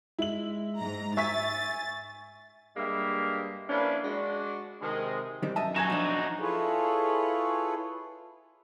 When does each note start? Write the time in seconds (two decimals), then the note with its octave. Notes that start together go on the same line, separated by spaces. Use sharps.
0.19 G#3 E4 F#7
0.79 G#2 A#5
1.17 E5 G#5 C#6 A6 B6
2.76 G2 G3 G#3 A#3 G4 E5
3.69 F3 A#3 C#4 D4 E4 B4
4.03 G#3 D4 F#4
4.82 C3 D#3 G#3
5.43 D#3 G3 C4
5.56 F#2 D#5 E5 A5
5.76 D#4 F#4 G#5 G#6 E7
5.90 F3 D4
6.40 E4 F4 G#4 A4 B4 C#5